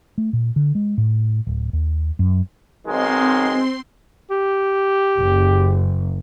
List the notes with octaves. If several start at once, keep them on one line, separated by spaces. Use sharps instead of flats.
A3
A#2
D3
G#3
A2
D1
D#2
F#2
B1 D#3 G#3 C4 C6
G4
F#1